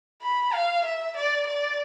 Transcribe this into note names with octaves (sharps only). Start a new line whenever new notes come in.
B5
F5
E5
D5
D5